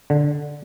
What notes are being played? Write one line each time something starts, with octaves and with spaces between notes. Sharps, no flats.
D3